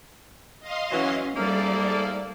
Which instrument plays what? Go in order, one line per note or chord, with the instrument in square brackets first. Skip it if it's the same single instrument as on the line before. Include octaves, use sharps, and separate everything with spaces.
[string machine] D#5 F5 C6
[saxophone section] E3 F#3 [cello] C#4
[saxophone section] G#2 A3 A#3 [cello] G3 [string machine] A4 D5